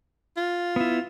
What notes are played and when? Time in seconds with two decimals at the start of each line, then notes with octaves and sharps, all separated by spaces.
0.37 F4
0.76 B3 E4